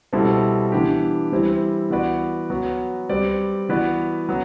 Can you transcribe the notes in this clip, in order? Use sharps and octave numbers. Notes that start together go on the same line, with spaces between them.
B2 G3 C4 E4 A4
E3 B3 D4 G4
E3 G3 C4 E4
E3 B3 F#4 B4 D5
F#3 B3 F#4
G3 C4 G4 B4 D5
E3 B3 F#4 B4 D5
F#3 B3